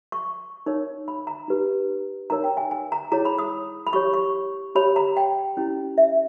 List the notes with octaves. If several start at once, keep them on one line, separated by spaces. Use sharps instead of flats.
C#6
D#4 A#4 C#5
B5
A#5
D#4 G4 B4
D#4 A#4 C#5 A#5
G5
G#5
G#5
A#5
E4 G#4 C#5 A#5
B5
D#6
B5
G4 C#5 C#6
C#6
G4 C#5 B5
A#5
G5
C#4 E4 G4
E5